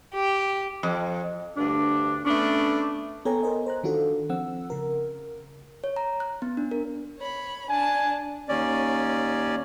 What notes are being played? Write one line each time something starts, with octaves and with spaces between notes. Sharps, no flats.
G4
F2
D2 G2 D4
A3 B3 C#4 D4
B3 A4 C#5 G5 G#5 A#5
A#4 C5 D#5 G#5
C5 A#5 F#6
D#3 D4 F4 F#4 A4
F3 C4 F#5 E6
C#3 A#4
C#5
A#5
F#6
B3
D4
A#4
C#5 B5
D4 G#5 A5
D#2 C#4 D5